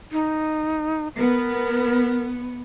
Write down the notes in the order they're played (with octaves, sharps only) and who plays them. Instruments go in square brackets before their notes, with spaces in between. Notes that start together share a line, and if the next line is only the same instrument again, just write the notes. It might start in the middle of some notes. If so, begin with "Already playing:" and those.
[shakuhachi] D#4
[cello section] B3 [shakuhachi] A#4